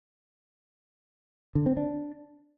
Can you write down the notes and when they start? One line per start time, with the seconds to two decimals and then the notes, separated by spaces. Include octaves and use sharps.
1.55 D3
1.66 C4
1.77 D4